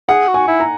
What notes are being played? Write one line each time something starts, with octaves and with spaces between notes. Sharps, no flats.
G#4 F#5
F#4
G#5
E4
A#5